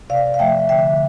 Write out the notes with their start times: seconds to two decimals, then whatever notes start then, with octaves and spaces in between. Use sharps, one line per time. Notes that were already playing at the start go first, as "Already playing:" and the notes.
0.10 C3 D5 F5
0.34 F5
0.39 F3 A3 E5 G5
0.69 D3 E5 G5